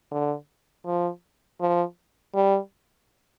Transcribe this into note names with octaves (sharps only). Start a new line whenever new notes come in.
D3
F3
F3
G3